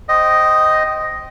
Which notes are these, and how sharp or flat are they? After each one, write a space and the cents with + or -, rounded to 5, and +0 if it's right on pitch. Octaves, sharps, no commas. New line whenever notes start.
C5 +0 D#5 +0 G5 -20